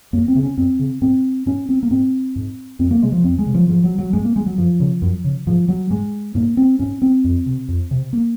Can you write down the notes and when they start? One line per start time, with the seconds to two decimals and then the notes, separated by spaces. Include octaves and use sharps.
0.13 F#2 A#3
0.28 C4
0.35 C#3
0.43 C#4
0.57 F#2 C4
0.79 C#3
1.01 G#2 C4
1.46 G#2 C#4
1.69 C4
1.83 A#3
1.90 G#2 C4
2.36 G#2
2.79 F2 C4
2.91 A#3
3.02 C3 G#3
3.13 F3
3.24 F2 C4
3.38 G#3
3.46 C3
3.54 F3
3.68 G#2 F3
3.84 F#3
3.98 F#3
4.13 G#2 G#3
4.25 A#3
4.36 G#3
4.46 F#3
4.57 F#2 F3
4.80 C#3
5.02 F#2
5.24 C#3
5.47 G#2 F3
5.68 F#3
5.90 G#2 G#3
6.35 G#2 A#3
6.57 C4
6.79 G#2 C#4
7.02 C4
7.24 F2
7.46 C3
7.68 F2
7.91 C3
8.13 A#3